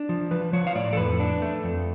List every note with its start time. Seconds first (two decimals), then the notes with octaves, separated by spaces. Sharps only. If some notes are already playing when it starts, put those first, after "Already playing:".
Already playing: D4
0.09 F3
0.31 F3 B4
0.53 F3 C#5
0.67 F5
0.75 A2 D5
0.93 A4
0.97 F2 B4
1.20 D4
1.42 A3
1.64 F2